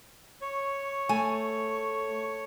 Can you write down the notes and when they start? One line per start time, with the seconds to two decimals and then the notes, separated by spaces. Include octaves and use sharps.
0.41 C#5 C#6
1.09 A3 G#5